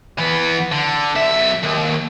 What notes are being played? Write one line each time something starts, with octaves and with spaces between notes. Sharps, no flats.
E3 B3
D3
B1 E5
D#2